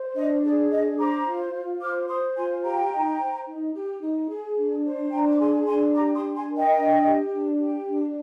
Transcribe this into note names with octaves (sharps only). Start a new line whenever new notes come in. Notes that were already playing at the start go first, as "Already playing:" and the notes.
Already playing: C5
D4 D#5
G#4 D5
D4 D#5
C5 A#5 D6
F4
F4
C5 D6 F6
C5 C6 D#6
F4 G#5 C6
G4 G5 A#5
D#4
C5
D#4
G4
D#4
G#4
D4
C5
D4 G5 A#5
D6
G#4 G#5 C6
D4 G#5 C6
G4 A#5 D6
C6 D#6
D4
G#5 C6
A#4
D#5 G5
D4
G4
D4
G4
D4